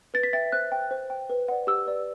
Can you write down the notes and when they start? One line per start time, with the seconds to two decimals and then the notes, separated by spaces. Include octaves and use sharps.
0.14 B4 A6
0.23 B6
0.33 E5 G5 A6
0.52 C5 F#6
0.72 G5
0.91 C5
1.10 G5
1.30 B4
1.48 D5 F#5
1.67 G4 E6
1.86 B4 D5